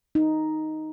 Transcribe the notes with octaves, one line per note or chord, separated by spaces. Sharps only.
D#4